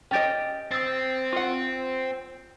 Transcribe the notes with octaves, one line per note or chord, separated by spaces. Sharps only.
C#4 G4 D#5 G5 A6 D7
C4 D#6 E6 A6
F4 F#5